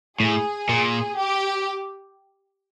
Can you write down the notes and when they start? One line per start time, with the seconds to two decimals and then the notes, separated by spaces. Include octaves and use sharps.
0.20 A2 G#4
0.69 A#2
1.17 G4